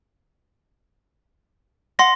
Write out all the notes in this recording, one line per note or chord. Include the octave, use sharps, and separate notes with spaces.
D#5 F5 F#5 C6 A#6